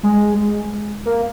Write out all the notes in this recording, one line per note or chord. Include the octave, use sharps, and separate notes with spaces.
G#3
A#3